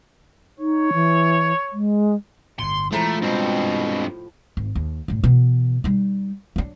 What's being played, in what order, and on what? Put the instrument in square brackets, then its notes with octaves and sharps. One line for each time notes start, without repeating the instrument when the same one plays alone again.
[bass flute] D#4 [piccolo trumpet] C#5
[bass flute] E3
G#3
[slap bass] G1 A2 [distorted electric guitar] C6
[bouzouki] A2 F3 A#5 [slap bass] E3 G#3 [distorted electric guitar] A3
[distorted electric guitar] G2 C4 [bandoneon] B2 [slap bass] G#3
[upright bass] G#1
D#2
F#2 A2
B2 E3
G3 D#4
F#3 D4